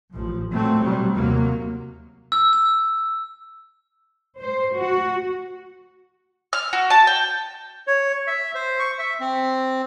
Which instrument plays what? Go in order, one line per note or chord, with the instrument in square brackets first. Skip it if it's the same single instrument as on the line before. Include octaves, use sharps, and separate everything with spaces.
[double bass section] A1 F3
A#2 F#3 A3 C4
B2 F#3 G3
D#2 C3 F#3 A#3
[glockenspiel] E6
E6
[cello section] C5
F#4
[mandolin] F6
F#4
A5
G5
[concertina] C#5
E5
C5
C#6
E5
C4